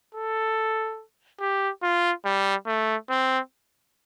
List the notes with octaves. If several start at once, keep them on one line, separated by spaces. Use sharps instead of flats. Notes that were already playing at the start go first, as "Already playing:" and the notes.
A4
G4
F4
G3
A3
C4